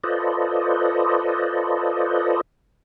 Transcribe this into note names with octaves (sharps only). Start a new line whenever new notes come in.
F4 A4 B4 C5 D5 D#5